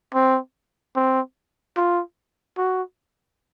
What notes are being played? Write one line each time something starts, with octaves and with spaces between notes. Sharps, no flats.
C4
C4
F4
F#4